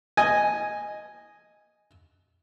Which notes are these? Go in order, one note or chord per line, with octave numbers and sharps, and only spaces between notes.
D#5 G#5